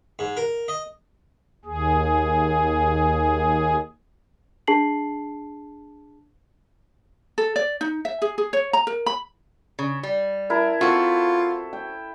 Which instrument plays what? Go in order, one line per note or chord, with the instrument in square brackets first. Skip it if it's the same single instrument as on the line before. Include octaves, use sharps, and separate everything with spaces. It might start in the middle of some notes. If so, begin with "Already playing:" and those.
[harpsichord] G#2
A#4
D#5
[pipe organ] D#2 G#4
[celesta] D4 G#4 A5 C7 F#7
[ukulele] A4
D5
D#4
E5
G#4
G#4
C#5
A#5
A#4
B5
[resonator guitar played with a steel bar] C#3
G3
[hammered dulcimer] E4 A#4 A5
[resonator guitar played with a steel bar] C4 F#4 [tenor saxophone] F4 [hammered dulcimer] A4
[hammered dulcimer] G5